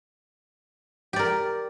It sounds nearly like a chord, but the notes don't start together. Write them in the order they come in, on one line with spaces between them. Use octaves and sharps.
G4 D5 A#4